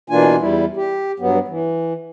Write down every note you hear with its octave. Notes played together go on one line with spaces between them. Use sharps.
B2 E3 A#3 D4 F4 G#5
E2 G3 E4
G4
G2 F#3 B3
E3